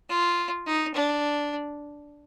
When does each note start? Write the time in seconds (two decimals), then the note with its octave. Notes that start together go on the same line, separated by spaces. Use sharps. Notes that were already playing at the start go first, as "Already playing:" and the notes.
0.09 F4
0.67 D#4
0.94 D4